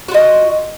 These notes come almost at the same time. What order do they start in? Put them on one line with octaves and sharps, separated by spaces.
F#4 F4 D#5